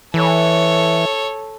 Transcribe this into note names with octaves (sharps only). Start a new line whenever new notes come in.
E3 A4 C#5